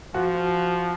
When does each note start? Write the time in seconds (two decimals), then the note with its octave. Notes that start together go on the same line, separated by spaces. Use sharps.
0.14 F3 F#4